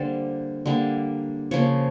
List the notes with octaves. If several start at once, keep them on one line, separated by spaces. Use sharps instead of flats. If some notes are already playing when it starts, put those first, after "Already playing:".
Already playing: D3 G3 A#3 C5
D3 G3 A#3
C#3 F3 A#3 C#5